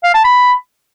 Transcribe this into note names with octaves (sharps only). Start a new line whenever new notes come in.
F5
A5
B5